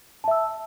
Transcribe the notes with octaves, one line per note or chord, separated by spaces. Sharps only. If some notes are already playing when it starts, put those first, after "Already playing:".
E5 A5 E6